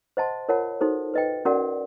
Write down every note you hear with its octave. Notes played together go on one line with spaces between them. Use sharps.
C5 D#5 F#5 A5 C6
F4 A#4 C#5 F#5 A5
D#4 F#4 A4 C5
B4 D#5 G5
C#4 F#4 A#4 D5 F#5